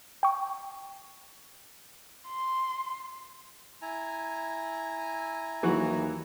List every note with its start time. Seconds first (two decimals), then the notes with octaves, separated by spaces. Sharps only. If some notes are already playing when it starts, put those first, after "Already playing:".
0.23 G5 C#6
2.27 C6
3.82 E4 G#5 A#5
5.63 D#2 E3 F#3 F#4